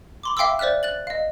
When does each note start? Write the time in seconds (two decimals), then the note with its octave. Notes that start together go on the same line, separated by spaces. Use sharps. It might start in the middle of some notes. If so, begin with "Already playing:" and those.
0.23 B5 C6 D6
0.37 E5 F5 G5 C6 D6 E6
0.59 C5 D5 E5 F6 F#6
0.83 F#6 A6 F#7
1.07 D#5 F5